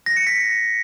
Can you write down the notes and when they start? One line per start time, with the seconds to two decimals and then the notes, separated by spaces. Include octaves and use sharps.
0.06 A#6
0.17 C#7
0.27 B6